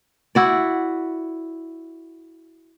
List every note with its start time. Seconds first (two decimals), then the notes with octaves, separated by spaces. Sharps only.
0.35 E4 F#4 D5